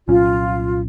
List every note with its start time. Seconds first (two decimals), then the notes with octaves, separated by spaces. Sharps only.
0.08 C2 A#2 F#3 C#4 F4